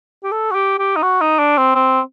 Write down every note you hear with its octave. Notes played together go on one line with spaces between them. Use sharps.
G4
A4
F#4
G4
G4
D#4
F#4
D#4
D4
C4
C4